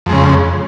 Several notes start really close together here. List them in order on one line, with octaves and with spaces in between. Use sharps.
F2 G#3 C#3